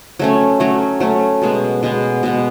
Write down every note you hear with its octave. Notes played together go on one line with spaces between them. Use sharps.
F#3 A3 C#4
F#3 A3 C#4
F#3 A3 C#4
B2 G#3 B3
B2 G#3 B3
B2 G#3 B3